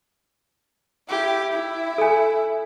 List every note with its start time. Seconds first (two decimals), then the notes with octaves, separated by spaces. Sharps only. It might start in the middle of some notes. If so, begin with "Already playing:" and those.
1.09 E4 G4
1.52 E4
1.98 A4 G#5